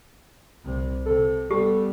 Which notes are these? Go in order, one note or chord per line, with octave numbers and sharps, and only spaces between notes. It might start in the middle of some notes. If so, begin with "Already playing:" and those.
C2 C3
C3 A4
G3 B3 G4 A4